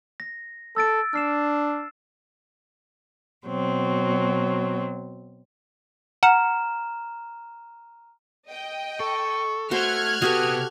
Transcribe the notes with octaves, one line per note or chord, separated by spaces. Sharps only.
A#6
A4 E6 A6 D7
D4 F6 C7 E7
B2 F#3 C4
F#5 A#5 F6 E7
D#5 G5
A4 C#6
A3 F#4 C5 F6 F#6 G#6
C3 B3 F#4 G4 A4 B4 D#6